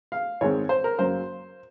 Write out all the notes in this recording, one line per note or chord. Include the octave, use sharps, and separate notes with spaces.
F5
G#2 D#3 G#3 C4 C#5
C5
A#4
F#2 C#3 F#3 A#3 C5